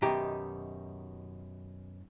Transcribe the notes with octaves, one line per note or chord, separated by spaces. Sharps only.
F#2 B2 D#3 D#4 G4 A#5